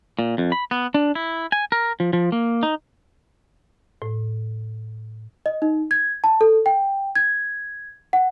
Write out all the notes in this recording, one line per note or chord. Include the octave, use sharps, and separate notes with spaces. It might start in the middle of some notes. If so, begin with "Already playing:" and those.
A#2
F2
B5
B3
D4
E4
G#5
A#4
F3
F3
A#3
D#4
A2
D#5
D#4
G#6
A5
A4
G5
G#6
F#5